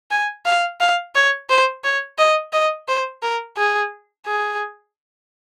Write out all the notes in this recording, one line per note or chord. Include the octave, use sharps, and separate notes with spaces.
G#5
F5
F5
C#5
C5
C#5
D#5
D#5
C5
A#4
G#4
G#4